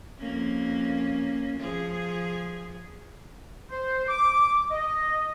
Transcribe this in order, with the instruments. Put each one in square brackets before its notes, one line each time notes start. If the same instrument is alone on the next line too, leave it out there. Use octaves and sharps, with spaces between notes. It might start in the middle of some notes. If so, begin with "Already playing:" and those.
[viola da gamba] F2 A#3 C#4
F3 G#4
[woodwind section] C5
D6
D#5